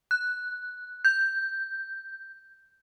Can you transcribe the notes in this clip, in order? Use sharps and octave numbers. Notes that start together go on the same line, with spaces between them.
F#6
G6